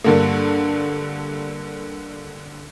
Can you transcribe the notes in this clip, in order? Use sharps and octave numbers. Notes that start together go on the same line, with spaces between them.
G2 D3 A#3